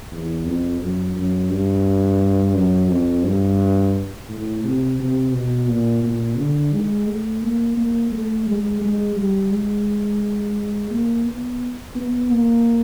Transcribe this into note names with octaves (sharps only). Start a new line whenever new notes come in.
E2
F2
F#2
F#2
G2
F#2
F2
G2
A2
C3
C3
B2
A#2
A#2
D3
G#3
A3
A#3
A#3
A3
G#3
G#3
G3
G#3
A#3
B3
B3
A#3